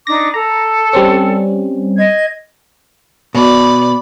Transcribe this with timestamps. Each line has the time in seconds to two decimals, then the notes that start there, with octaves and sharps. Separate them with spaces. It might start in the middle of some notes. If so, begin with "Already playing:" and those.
0.07 D4 D#4 D6 A#6
0.34 A4 A#5
0.93 G3 C4 C#4
1.97 D#5 G#6
3.35 B2 D5 B5